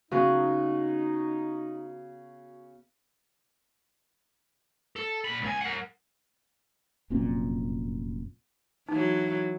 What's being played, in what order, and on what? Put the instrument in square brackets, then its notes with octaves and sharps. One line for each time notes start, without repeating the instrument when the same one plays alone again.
[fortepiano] C#3 [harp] B3 F#4 [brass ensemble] D#4
[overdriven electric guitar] A4
A#2 B5
C#2 G#5
A#4 F#5
[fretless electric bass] F1 F#2 A#2 C4
[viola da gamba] E3 F#3 [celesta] D#4